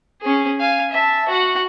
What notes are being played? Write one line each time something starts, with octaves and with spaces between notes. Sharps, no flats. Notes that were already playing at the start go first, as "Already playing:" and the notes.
C#4 G#4
F5 G#5
E5 A5
F#4 F#5